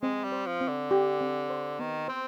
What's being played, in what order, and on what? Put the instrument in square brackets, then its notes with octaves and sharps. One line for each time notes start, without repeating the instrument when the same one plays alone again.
[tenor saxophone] G#3 [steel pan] C4
[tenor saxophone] G3
[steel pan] C5
[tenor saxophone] F3
[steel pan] C4
[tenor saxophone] D3
[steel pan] G4
C4
C5
[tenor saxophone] D#3 [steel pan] B3
[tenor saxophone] C4 [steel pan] C5